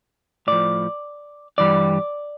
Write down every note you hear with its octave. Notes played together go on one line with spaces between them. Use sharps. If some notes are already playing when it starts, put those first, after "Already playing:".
A2 F3 D5
G2 E3 G3 D5